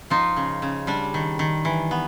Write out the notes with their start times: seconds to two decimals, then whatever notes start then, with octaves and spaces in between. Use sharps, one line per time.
0.10 F3 D#4 F4
0.36 C#3
0.62 C#3
0.87 G3 D4
1.14 D#3
1.39 D#3
1.65 E3
1.91 B3